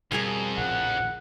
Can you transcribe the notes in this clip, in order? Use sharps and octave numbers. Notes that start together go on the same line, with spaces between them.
F2 B2 G3 G#4 A#4 G#5
A#1 A2 C#3 F#5